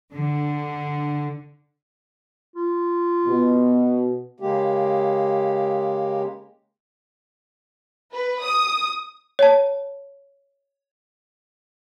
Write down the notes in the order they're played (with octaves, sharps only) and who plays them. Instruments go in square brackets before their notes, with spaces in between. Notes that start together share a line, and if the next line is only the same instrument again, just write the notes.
[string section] D3
[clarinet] F4
[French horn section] B2
[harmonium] C#3 G#3 A#3 G4
[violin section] B4
D#6
[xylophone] C#5 A5